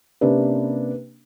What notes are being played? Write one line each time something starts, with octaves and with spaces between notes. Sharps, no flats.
C3 A#3 C#4 D4 B4